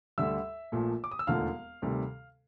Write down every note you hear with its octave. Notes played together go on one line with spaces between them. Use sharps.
D2 D3 G3 E5 E6
A#1 A#2 F3 A3
D6
D#6
E6
E1 D#2 D3 F3 A3 F5 F6
D2 C3 D#3 G3